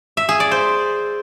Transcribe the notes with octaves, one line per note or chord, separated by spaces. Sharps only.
E5
G#4
D5
C5